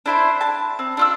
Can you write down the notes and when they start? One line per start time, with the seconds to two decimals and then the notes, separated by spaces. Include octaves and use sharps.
0.06 D4 E4 C5
0.41 A5
0.79 C4
0.97 D4 F4 E6